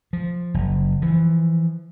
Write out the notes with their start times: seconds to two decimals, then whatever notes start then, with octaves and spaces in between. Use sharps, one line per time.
0.13 F3
0.54 F#1
1.02 E3 F3